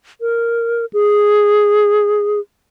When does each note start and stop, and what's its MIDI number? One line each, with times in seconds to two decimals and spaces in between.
0.21 0.85 70
0.93 2.40 68